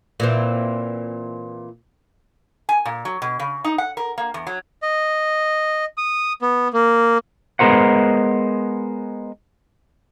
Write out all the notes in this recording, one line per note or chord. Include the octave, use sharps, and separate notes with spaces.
A#2 E3 C4
G#5
A#2
F#3
B2
C#3
D#4
F#5
A#4
A#3
E2
F#3
D#5
D#6
B3
A#3
G#3 B3 G4 A#4 C5 F#5